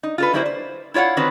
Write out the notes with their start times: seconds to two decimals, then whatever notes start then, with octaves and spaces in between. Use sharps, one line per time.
0.03 D#4
0.18 F4 A4 B4
0.33 F#3 G3 A#3 E4 F#4 C5
0.46 C5
0.94 E4 F4 C#5 F5 F#5
1.17 D#3 C4 F#4 B4 C#5